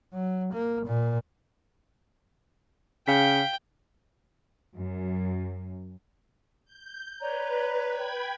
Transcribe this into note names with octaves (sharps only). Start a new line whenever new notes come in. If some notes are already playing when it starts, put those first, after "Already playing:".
F#3
A#3
A#2
C#3 F5 G5 B6
F#2
G6
B4 C#5 D5 A#5
G5 B5 G#6